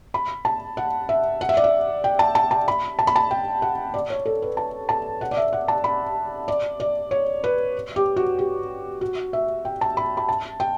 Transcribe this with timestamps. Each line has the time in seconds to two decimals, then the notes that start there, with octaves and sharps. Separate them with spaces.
0.14 B5
0.45 A5
0.77 F#5
1.09 E5
1.41 F#5
1.49 E5
1.57 D5
1.64 E5
2.04 G5
2.19 A5
2.35 A5
2.51 A5
2.68 B5
2.99 A5
3.07 B5
3.16 A5
3.31 G5
3.62 F#5
3.94 D5
4.10 C#5
4.26 A4
4.42 B4
4.57 A5
4.89 A5
5.21 F#5
5.31 D5
5.37 E5
5.53 F#5
5.68 A5
5.84 B5
6.48 D5
6.80 D5
7.11 C#5
7.44 B4
7.96 G4
8.16 F#4
8.39 G4
9.01 F#4
9.33 E5
9.65 G5
9.81 A5
9.97 B5
10.17 B5
10.29 A5
10.60 G5